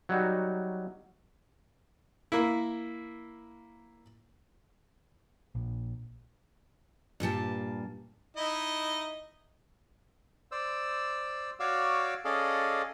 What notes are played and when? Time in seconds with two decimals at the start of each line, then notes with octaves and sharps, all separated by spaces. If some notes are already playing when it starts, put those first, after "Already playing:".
0.09 F#3 G3 D#4 F#4
2.32 A#3 E4
5.55 A#1
7.20 G2 A#2 G3 A5
8.36 D#4 E4 D#5
10.52 C5 D5 E6
11.60 F#4 C#5 D5 F5 D6 E6
12.25 C#4 G#4 A4 D5 D#5 F5